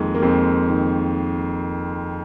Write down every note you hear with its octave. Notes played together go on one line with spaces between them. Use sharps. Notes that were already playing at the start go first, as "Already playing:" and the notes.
Already playing: F2 D#3 G#3 A#3
A#3
F2 G#3 C4
D#3